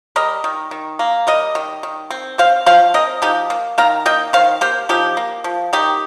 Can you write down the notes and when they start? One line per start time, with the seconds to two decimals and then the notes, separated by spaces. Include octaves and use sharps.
0.16 G3 A#4 D#5
0.44 D#3
0.71 D#3
0.99 A#3
1.27 G3 A#4 D#5
1.55 D#3
1.83 D#3
2.10 C4
2.38 C4 C5 F5
2.66 F3 C5 F5
2.94 C4 A#4 D#5
3.22 F3 D#4 G4
3.50 A#3
3.78 D#3 F5 A#5
4.06 A#3 D#5 G5
4.33 D#3 C5 F5
4.61 A#3 G4 C5
4.89 F3 D#4 G4
5.17 A#3
5.44 F3
5.73 D#3 D#4 G4